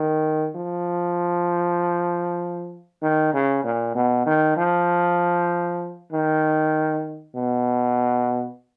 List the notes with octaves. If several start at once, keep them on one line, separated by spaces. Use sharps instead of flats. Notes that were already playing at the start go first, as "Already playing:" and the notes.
Already playing: D#3
F3
D#3
C#3
A#2
B2
D#3
F3
D#3
B2